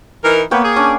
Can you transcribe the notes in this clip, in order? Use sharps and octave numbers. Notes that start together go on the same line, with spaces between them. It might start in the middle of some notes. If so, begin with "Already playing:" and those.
E3 D#4 A#4
A#3 B3 C#5 G5
G#4
C#4 D4 D5